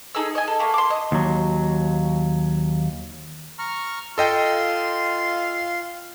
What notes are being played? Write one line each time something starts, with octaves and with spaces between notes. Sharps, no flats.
D#4 G#4 A4 E6
D#5 G#5
A4
A3 A#3
C6 D6
D#5
D#2 F#3
A#5 C#6 F6
F4 A4 D#5 F5 G5 C6